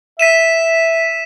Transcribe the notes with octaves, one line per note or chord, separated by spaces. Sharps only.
E5 B6 D#7 E7